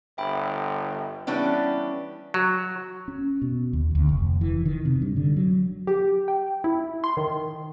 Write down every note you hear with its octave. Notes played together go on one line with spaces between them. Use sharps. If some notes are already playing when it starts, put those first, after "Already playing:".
G1 E5 G5 B5
E3 G3 B3 C#4 D4
F#3
C#4
B2
D#2
D2
F1
E3
D#3
C3
G2
D3
F#3
G4
G5
E4
C6
D#3